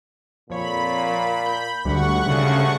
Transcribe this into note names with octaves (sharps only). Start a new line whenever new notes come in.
F2 A#2 C#5 B5
G6
D2 G#2 G3 F#5 C#6
D2 C#3